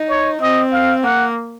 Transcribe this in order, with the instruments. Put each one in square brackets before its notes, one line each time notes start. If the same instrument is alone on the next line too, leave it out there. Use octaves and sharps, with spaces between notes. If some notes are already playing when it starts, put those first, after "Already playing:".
Already playing: [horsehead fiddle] D#4
[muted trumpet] C#5
[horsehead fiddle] C4 [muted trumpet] D#5
[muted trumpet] F5
[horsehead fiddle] A#3 [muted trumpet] F#5